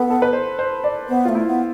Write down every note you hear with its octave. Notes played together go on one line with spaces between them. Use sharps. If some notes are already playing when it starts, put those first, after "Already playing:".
Already playing: B3 A4 B4
A4
B4
C5
C5
D5
B3 C5
A3 F4
E4
B3